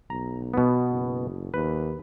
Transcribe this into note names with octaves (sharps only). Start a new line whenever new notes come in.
B1 A#5
B2 B3
F#1
D#2 B4